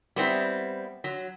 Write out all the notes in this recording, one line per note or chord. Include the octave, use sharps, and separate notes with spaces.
G3 B3 C4 E4
F#3